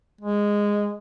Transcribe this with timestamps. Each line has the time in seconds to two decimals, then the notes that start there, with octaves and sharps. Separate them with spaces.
0.21 G#3